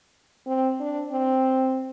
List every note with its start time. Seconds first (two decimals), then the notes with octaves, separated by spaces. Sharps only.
0.47 C4
0.80 D4
1.11 C4